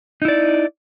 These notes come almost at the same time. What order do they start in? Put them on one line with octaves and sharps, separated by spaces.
D#4 E4 D5